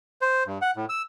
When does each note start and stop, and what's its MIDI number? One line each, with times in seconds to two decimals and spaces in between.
0.21 0.43 72
0.46 0.58 43
0.62 0.71 78
0.76 0.85 45
0.89 1.02 88